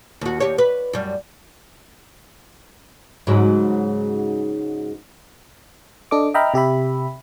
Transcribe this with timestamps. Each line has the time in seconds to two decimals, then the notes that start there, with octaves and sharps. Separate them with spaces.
0.21 D#2 F#4
0.40 D#2 G4 C#5
0.58 B4
0.93 F#2 G3
3.27 G#2 C#3 F#3
6.11 D4 A4 D#5 D6
6.34 D#5 E5 G5 A#5 B5 F6
6.54 C3 G4 E5 B5